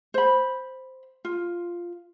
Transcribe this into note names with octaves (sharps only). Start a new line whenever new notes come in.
C5 B5
F4